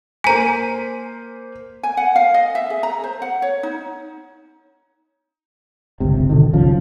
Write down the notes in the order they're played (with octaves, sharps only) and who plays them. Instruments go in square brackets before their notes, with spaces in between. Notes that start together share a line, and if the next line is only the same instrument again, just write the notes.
[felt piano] A#3 C5 B6 [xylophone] G#5 A#5
[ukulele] G#5
F#5
F5
D#5
E5
G#4
A#5
C5
F#5
C#5
D#4
[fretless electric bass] G1 C#2 C3
B2 D3 D#3
F#1 C2 C#3 F3